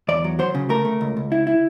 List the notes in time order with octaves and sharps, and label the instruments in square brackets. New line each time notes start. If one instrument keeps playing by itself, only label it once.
[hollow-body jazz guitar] E2 D5
F#3
F#3 C5
C#3
A3 A#4
A3
C#2
C#2
E4
E4